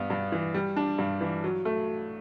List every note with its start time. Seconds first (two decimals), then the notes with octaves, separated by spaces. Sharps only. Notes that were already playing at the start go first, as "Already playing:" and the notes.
Already playing: G2 B3
0.10 G2
0.32 E3
0.54 G3
0.76 D4
0.98 G2
1.21 E3
1.44 F#3
1.65 A3